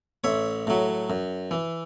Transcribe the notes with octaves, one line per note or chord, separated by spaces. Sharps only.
A1 C#5 E5
A2 F#3
F#2
E3